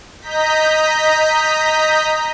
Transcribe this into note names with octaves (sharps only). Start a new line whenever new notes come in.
D#5 A#5 G6 B6